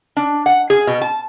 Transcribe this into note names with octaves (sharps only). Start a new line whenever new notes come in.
D4
F#5
G#4
B2
A5